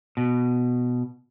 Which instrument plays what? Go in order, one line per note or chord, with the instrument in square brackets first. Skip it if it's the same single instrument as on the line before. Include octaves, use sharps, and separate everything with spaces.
[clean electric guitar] B2